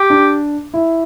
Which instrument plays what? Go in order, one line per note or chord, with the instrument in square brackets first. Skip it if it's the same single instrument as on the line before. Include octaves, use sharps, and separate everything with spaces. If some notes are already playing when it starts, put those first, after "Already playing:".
Already playing: [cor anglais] G4
[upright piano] D4
E4